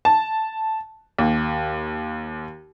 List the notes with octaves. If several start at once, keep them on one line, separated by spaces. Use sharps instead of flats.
A5
D#2